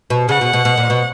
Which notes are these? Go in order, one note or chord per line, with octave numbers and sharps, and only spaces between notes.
B2
C#3 F#5
B2
B2
B2
A#2
B2